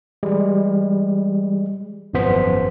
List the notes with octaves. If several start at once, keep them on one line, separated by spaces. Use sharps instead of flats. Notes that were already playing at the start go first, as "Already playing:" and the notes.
E3 G3 G#3
G#1 F#2 F3 B3 C5 B6